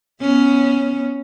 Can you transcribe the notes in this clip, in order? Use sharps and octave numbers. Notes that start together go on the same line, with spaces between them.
B3 C#4